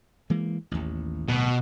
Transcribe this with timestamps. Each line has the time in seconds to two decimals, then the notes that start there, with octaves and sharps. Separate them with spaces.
0.30 E3 G#3 A#3
0.71 A1 D#2
1.28 D1 B2